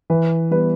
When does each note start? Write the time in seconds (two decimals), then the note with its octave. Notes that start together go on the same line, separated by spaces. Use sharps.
0.10 E3 B4
0.51 G3 B3 B4